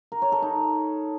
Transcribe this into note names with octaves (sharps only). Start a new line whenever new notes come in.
A#4
C#5
A4
D#4